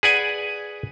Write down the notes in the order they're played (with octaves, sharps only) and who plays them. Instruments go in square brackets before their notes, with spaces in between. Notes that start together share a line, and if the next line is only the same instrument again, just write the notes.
[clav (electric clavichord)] G#4 B4 D5 F#5 G#5